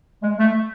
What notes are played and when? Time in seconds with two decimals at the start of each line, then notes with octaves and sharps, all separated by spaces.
0.22 G#3
0.39 A3